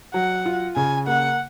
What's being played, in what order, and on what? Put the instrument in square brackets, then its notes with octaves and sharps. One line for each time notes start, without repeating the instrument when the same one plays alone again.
[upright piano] F#3 [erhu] F#5
[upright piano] F4
[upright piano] C#3 [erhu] G#5
[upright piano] A#3 [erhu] F#5